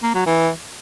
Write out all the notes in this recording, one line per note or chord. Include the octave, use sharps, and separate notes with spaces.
A#3
F#3
E3